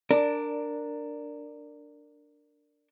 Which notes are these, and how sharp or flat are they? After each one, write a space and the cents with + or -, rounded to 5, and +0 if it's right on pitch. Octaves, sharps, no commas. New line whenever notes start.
D4 +0 A#4 -15 D5 +0